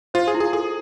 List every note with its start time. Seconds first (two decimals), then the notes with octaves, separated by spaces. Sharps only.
0.14 F4 C5
0.28 G#4
0.35 E4
0.40 G#4
0.53 G#4 A4